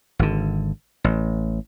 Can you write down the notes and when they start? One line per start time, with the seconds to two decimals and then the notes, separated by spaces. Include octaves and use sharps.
0.19 G#1 D3
1.04 A1